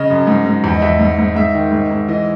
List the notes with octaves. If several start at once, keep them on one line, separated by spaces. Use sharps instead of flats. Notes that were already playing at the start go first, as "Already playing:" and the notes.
Already playing: C#3 D#5
F#2
G#2
G#2
E2
D#5
E2 E5
G#2
G#2
G#2 E5
D#3
G#2
G#2
E3 D#5